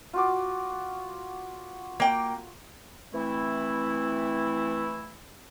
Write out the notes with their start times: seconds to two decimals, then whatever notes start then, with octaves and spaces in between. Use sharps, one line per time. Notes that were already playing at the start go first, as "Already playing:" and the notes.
0.13 F4 F#4 D6
2.00 A#3 G5
3.13 E3 A3 C4 E4